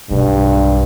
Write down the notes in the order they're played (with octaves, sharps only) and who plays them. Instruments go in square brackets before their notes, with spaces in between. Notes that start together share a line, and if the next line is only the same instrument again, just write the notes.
[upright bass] B1 [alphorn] G2